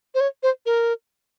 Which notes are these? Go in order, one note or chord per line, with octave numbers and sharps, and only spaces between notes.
C5
C#5
C5
A#4